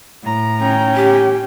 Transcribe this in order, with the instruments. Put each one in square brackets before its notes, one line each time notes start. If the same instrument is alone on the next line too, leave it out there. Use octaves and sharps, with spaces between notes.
[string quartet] A2 A#5
[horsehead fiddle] C#4 G5
[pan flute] G4